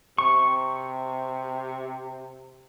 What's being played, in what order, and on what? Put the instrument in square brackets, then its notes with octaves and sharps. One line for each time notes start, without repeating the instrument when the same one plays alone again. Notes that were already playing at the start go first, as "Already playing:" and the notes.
[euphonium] C3 [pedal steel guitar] C#6